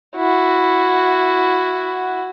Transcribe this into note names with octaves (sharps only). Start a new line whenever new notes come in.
E4 F#4